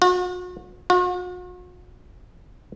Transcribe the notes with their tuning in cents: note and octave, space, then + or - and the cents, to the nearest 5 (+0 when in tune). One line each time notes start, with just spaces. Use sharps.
F#4 -40
F#4 -45